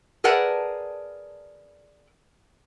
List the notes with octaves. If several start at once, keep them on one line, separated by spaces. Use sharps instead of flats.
G#4 A#4 B4 D5 F#5 A5